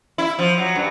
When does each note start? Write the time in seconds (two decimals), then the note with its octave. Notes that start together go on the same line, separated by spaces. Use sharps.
0.18 E4
0.39 F3
0.58 F#3
0.75 G2